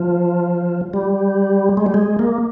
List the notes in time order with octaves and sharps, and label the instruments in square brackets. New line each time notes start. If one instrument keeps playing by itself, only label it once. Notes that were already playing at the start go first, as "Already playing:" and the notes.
Already playing: [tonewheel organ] F3
G3
G#3
G3
G#3
A#3